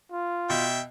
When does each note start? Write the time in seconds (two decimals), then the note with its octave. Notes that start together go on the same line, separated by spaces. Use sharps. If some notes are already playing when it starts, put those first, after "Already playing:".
0.12 F4
0.50 B2 E5 G5